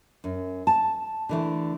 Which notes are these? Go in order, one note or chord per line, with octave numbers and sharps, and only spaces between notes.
F#2
A5
D3 E3 A3